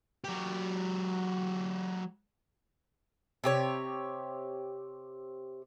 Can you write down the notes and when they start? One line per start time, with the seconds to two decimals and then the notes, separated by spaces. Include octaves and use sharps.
0.24 F#3 G4
3.44 C3 G4 C#5